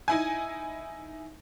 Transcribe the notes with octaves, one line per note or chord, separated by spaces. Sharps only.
D#4 E4 G#5